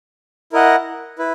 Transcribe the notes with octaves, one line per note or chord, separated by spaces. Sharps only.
E4 A#4 D#5 F#5
E4 B4